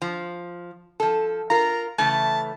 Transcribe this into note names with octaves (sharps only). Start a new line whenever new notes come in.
F3
F3 A4
F4 A#4 A#5
C#3 E3 A3 A5